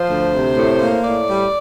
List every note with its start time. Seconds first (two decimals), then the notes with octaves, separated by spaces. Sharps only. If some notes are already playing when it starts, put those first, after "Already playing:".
Already playing: F3 C5
0.09 D2
0.33 C3
0.56 A2
0.80 A#3
1.04 A2 D5
1.29 G3